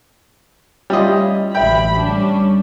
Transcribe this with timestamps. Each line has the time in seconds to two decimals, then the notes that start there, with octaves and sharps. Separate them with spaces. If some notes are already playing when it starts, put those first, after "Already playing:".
0.90 G3 C#4 E4 F4 D#5
1.55 A1 D2 G4 E5 G5 B5
2.03 G3 C#4 D4